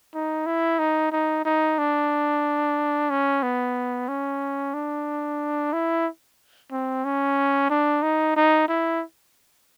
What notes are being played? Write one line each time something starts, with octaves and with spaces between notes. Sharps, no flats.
D#4
E4
D#4
D#4
D#4
D4
C#4
B3
C#4
D4
E4
C4
C#4
D4
D#4
D#4
E4